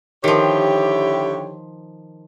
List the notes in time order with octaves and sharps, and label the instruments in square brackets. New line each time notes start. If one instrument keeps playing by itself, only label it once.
[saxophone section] D3 E4 G4 [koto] D#3 F3 [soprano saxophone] C#5